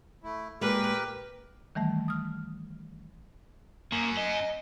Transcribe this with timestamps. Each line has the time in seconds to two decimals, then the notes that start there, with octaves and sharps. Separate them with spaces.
0.23 A3 E4
0.61 A#2 G#3 A#3 G4 A#4 B4
1.75 D#3 E3 G3 A3
2.08 D#6 F6
3.92 F#2 A#3
4.17 D#5